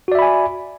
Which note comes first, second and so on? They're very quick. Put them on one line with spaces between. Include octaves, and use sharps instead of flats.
F#4 D5 E5 B5 G#5